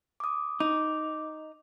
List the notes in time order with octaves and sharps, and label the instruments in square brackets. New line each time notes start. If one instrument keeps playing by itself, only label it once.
[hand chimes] D6 D#6
[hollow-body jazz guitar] D#4 [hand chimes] D6